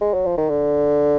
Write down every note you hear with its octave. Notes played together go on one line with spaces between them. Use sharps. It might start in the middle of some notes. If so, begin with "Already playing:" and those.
G#3
F#3
F3
D#3
D3